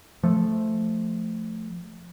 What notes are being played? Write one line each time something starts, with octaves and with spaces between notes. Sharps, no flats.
F3 A3